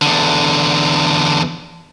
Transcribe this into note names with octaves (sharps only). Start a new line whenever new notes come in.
E2 D3